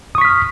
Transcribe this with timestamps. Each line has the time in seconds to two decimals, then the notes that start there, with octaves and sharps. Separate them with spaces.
0.15 D#6
0.18 C#6
0.21 B6
0.25 F6